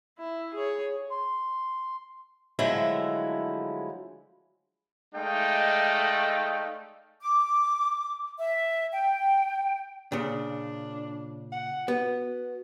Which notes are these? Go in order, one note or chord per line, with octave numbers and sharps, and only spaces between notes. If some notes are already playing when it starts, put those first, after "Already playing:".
E4
G#4 C#5
C6
D3 F3 F#3 G#3 A3 E4
G#3 A3 D#4 D5 F5 G5
D6
E5
G5
A#2 C#3 D4
F#5
B3 F#4